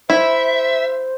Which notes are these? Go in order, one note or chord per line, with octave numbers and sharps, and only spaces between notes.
E4 C5 E5